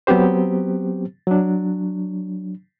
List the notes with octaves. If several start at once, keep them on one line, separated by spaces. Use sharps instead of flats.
F#3 B3 C4 G4 C5
F#3 D4